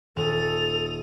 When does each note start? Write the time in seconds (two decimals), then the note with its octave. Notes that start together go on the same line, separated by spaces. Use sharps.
0.16 D#1 A4 D#6 F7